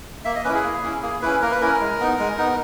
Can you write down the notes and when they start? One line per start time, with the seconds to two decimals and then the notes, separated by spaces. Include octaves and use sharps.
0.25 A#3 E5
0.35 D#5
0.45 C#4 B4
0.49 E4 G#4
0.64 A#3
0.83 C#4 E4
1.02 A#3 G#4
1.22 C#4 E4 B4
1.42 A#3 A#4
1.51 B4
1.61 C#4 E4 A#4
1.80 G#3
2.00 B3 D#4
2.19 G#3
2.38 B3 D#4